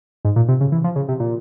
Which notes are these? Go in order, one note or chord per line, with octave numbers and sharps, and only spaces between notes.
G#2
A#2
C3
C#3
E3
F3
C#3
C3
A#2